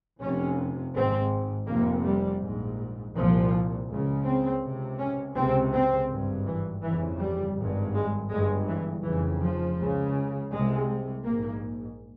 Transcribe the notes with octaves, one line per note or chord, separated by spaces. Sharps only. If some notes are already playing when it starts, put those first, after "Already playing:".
F1 F2 C3 C#4
G#1 G#2 C4
F1 F2 C3 A#3
G3
A#1 G#2
C2 A#2 F3
C#2 C#3
C4
C#2 C3
C#4
C#2 C3 C4
C4
G#1 G2
E3
G1 F2 C#3 E3
G3
G#1 G2
G#3
G1 G2 G#3
E3
F1 F2 C#3 E3
F3
C#2 C#3
C2 C3 G#3
A#1 G#2 A#3